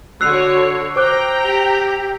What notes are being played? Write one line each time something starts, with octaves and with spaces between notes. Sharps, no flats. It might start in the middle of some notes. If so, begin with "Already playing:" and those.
D3 F#4 C#5 E6 F#6 C7 F7
C5 G5 A#5 D6 F#6
G4